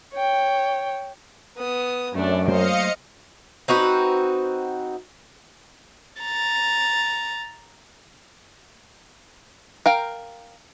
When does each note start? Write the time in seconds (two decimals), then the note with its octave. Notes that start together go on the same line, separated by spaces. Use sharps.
0.14 C#5 G5
1.57 B3 D#6
2.15 F#2 A3 D4
2.48 F#3 A3 A#3 C5 D#5 F5 C#7
3.68 C4 D#4 F#4 B4
6.22 A#5 A6
9.86 A#4 F5 G5